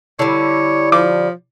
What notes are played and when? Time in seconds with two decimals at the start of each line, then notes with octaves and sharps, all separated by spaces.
0.19 D3 G3 E4 C#5 B5
0.92 F3 D6